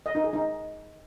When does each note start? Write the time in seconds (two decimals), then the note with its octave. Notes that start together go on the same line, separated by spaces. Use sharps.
0.06 D#5
0.15 D#4
0.24 G#4
0.33 D#4